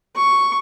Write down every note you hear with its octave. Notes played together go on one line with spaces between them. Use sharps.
C#6